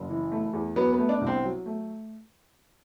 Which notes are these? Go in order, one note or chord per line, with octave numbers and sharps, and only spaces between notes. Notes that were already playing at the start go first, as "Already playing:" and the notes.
Already playing: F#1
E3
A3
E2
F#3 B3
B3
A3
D4
C2
C4
F#3
A3